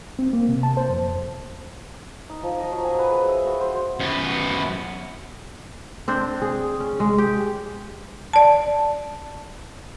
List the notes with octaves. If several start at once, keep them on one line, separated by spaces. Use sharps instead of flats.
C4
A#3
C3
A5
C5
F2
D#4
F3
D#5
F#3
G#5
B4
G#4
E5
F#4
C5
F#2 B3
C4 D4 C5
G#4
C#4
G#3
G4
D5 A5